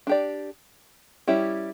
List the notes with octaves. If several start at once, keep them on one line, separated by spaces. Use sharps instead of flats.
D4 G4 D5
G3 C#4 E4 G4